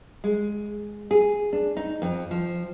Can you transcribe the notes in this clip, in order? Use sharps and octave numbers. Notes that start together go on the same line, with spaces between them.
G#3
G#4
D4
D#4
F2
F3